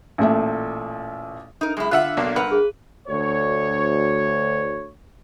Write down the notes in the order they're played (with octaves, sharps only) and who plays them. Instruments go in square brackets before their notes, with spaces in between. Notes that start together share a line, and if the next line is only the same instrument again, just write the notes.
[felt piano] A1 A#2 A3 E5
[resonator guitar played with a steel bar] D#4 A#4
[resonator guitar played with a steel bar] F#2 E4 [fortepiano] G#3
[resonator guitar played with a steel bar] D3 [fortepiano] F4 E5 F#5 [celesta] F#6
[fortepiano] B1 A#3 D4
[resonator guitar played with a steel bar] G2 A#4 F#5 [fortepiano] B4
[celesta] G#4
[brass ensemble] D2 C#5